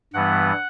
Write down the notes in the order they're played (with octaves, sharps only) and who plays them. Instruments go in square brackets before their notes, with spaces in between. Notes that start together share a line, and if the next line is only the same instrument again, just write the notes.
[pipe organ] G2 E3 G3 B3 F#5